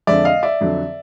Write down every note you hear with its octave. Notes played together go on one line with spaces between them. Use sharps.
F2 D3 F3 G#3 D5 E5
D#5 F5
D5 E5
F2 D3 F#3